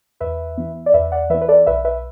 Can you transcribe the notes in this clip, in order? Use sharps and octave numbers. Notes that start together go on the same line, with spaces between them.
E2 B4 E5
E3 B3
D5
E2 B4 E5
D5 F#5
E3 B3 B4 E5
B4
A4 D5
B1 B4 E5
B4 E5